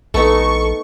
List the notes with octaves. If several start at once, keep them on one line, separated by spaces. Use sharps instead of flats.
A#1 A3 B3 D#4 A4 C#6